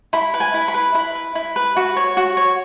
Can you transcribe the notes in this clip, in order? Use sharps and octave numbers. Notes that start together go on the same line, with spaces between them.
E4 B5
B4
G#5
E4
B5
B4
E4 B5
B4
E4
B4
F#4
C#5
F#4
C#5